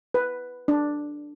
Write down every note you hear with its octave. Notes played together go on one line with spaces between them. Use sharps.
B4
D4